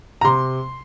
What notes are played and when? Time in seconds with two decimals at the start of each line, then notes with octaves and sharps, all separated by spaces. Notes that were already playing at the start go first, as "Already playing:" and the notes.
0.21 A#5
0.24 C3 C6